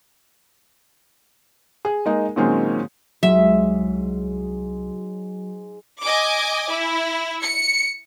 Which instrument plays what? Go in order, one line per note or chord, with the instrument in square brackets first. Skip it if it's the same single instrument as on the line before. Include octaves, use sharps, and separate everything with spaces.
[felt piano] G#4
G#3 A#3 D#4
A#2 D#3 F#3 G#3 C4 C#4
[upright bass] C2 [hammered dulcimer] G#2 G#3 [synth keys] F#3 [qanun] E5
[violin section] D#5 G#5 D6
E4
C#7